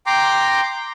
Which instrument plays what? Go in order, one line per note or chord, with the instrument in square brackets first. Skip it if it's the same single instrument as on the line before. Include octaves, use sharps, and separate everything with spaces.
[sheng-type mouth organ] G5 A#5 C6 D6